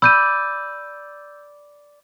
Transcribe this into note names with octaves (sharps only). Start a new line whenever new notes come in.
D5 B5 E6 G6 D#7